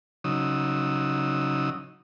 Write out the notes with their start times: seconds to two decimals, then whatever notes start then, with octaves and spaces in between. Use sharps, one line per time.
0.24 C#3 F#3 D#4 D#6 E6